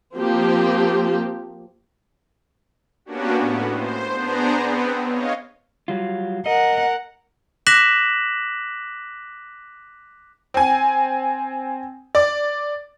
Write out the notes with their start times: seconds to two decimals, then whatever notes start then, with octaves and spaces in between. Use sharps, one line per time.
0.16 F3 A#3 C4 G4
3.05 A#3 B3 C#4 D4 F#4 G4
3.40 A2 B3
3.71 C5
4.16 B3 D4 G#4 C5 A#5
4.58 B3 C4
5.04 C#5 D#5 F5
5.88 F#3 G3 F4
6.46 A#4 D#5 F#5
7.67 D6 F#6 A#6 B6 E7 F#7
10.54 C4 G#5
12.15 D5